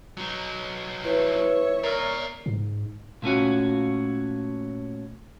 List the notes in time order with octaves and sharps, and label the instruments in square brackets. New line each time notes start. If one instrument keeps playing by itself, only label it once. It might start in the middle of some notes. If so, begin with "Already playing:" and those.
[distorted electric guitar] F#3 D#4
[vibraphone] E4 B4 [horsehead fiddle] C#5 E5
[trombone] A#4 [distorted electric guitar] D5 A#5 [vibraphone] C#6
[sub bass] G#2
[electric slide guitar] A#2 A3 C#4 F#4